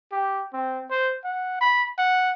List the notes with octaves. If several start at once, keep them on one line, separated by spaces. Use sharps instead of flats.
G4
C4
C5
F#5
B5
F#5